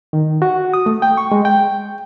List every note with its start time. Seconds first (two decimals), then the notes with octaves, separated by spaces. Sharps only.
0.13 D#3
0.42 F#4
0.74 D#6
0.86 A3
1.02 G5
1.17 C#6
1.32 G#3
1.45 G5